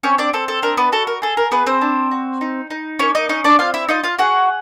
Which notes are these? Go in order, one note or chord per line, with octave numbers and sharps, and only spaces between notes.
C4 C#4 C#5
D4 D5
C4 A4
A4
D4 A#4
B3 B4
F#4 A4
A#4
G#4 A4
A#4
B3 G#4 B4
C4 C5
D4
F#4
D#4
D#4
A#3 C#4 C#5
D#4 D#5
C#4 D#4 D#5
D4 D5
C4 F4 F5
E4 E5
D#4 F4 D#5
F4 F5
F#4 G#4 F#5